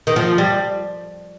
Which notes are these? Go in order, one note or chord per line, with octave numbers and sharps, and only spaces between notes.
D#3
F3
G3